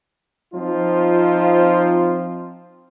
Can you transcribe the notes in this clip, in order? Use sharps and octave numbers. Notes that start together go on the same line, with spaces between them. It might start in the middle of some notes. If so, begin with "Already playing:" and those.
F3 C4 D#4 F4